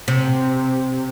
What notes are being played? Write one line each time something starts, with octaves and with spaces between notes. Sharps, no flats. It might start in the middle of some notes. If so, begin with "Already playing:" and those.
C3